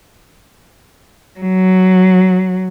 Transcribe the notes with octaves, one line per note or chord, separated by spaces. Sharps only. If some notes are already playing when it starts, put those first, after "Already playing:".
F#3